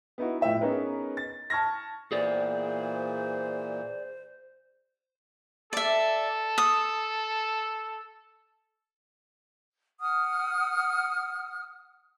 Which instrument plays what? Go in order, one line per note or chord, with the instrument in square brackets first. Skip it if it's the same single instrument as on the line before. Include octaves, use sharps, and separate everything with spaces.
[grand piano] B3 D#4 E4 F#4
A2 F3 E4 E5 G5
B3 C#4 D#4 G#4 A#4 B4
A6
A5 C#6 F6 G#6 A#6
[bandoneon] A#2 E3 [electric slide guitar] G#4 D5 [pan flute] C5
[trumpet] A4 [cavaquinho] D5 E5
[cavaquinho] D#6
[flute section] F#5 D#6 F6